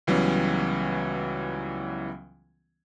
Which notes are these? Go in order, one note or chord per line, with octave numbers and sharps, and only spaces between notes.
C#2 E3 F#3 G3 B3 C#4